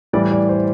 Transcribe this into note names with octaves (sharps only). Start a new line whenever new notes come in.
A2 E3 G3 D5
D5
C5